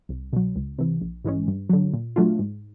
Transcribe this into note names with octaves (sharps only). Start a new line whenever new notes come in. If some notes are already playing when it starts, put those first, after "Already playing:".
C2
B2 F#3
C#2
C3 E3
A#1
G#2 E3 G#3 C#4
G2
D3 F#3
A#2
F#3 A3 D4 F4
G#2